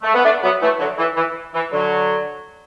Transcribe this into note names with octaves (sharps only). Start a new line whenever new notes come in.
A3
B3
A3 D4
F#3 B3
E3 A3
D3 F#3
E3
E3
E3
D3 F#3